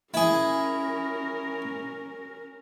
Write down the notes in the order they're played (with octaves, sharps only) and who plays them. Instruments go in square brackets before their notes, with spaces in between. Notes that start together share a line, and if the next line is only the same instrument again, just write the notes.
[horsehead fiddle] C#4 A#4 [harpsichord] E4 G#4